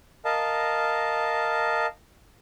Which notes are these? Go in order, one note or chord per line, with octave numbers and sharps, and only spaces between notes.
A#4 D#5 F5 A5